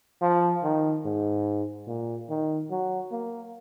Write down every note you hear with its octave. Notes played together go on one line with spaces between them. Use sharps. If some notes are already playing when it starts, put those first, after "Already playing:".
F3
D#3
G#2
A#2
D#3
F#3
A#3